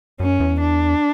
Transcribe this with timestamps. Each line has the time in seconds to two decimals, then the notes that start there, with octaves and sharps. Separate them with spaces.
0.20 F#2 C#4
0.40 E2
0.61 D4